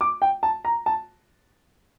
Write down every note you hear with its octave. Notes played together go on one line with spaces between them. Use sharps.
D6
G5
A5
A#5
A5